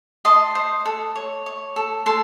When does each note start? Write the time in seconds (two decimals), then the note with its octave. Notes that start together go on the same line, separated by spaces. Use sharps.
0.25 D#5 A5 C6
0.55 C5
0.85 A4
1.16 C#5
1.46 C#5
1.76 A4
2.06 A4 A5 C6